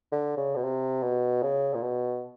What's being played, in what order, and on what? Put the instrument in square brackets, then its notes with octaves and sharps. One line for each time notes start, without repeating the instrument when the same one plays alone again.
[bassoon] D3
C#3
B2
C3
B2
C#3
A#2
B2